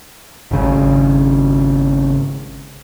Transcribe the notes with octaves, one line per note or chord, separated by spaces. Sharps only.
G#1 C#3